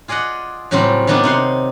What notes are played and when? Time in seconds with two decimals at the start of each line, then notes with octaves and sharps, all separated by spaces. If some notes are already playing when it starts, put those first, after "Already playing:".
0.08 F4 G#4 D5 D#5 F#5
0.71 A2 C#3 F#3 G3 C4 F4
1.07 D#3 F#3 B3 D4 F4 D5
1.23 C3 D#4 F#5 C6